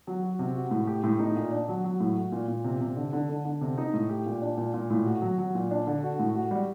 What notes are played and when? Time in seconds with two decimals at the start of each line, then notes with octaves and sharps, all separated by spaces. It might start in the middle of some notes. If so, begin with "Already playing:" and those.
0.07 F#3
0.23 F#4
0.39 C3
0.55 F#4
0.71 A2
0.87 G4
1.04 A2
1.19 D#4
1.36 A#2
1.52 D4
1.68 F#3
1.84 F#3
2.00 A2
2.16 F#4
2.32 A#2
2.48 A#2
2.64 C3
2.81 C3
2.96 D3
3.13 D3
3.29 D3
3.45 D3
3.61 C3
3.78 D#4
3.94 A2
4.09 G4
4.26 A#2
4.42 D4
4.58 A#2
4.74 A#2
4.90 A2
5.06 F#4
5.22 F#3
5.38 F#3
5.55 A#2
5.71 D4
5.87 D3
6.03 F#4
6.19 A2
6.35 F#4
6.51 G3